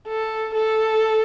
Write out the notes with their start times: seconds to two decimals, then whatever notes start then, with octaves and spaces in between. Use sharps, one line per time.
0.08 A4
0.54 A4